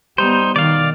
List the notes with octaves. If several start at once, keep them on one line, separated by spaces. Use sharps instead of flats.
G3 B3 D#4 C5
B2 D#3 D5 F5